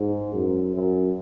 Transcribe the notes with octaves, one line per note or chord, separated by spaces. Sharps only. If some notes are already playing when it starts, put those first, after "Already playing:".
Already playing: G#2
F#2
F#2